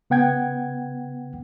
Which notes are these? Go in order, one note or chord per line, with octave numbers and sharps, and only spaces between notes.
C#3 B3 F#5 G5 G#6